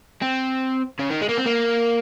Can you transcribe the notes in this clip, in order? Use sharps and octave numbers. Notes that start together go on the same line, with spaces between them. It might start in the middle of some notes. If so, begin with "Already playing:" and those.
C4
C#3
D#3
G#3
A#3
C4
A#3